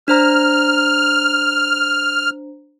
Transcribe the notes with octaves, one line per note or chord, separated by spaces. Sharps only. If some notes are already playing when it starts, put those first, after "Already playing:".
D4 C5 A#5 F6